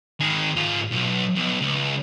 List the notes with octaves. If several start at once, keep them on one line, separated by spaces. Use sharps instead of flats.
D#3 G#4
G#2 F4
B1
B1
C#2